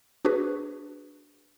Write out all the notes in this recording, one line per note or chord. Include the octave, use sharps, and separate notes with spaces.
D4 F#4 G#4 B4